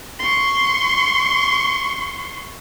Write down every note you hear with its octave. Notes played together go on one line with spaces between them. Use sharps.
C6 C#6